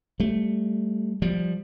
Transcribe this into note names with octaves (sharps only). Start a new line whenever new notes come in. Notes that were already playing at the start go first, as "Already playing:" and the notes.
G3 A3
F3 G3